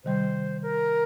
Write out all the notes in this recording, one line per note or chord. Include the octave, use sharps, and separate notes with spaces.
C3 D#3 G3 C5
A#4